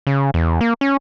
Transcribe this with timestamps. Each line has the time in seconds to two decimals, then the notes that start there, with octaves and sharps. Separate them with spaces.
0.07 C#3
0.34 E2
0.61 A#3
0.81 C#4